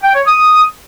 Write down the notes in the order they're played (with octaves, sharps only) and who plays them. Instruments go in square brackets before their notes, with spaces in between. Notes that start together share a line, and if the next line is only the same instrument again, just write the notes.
[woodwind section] G5
C#5
D#6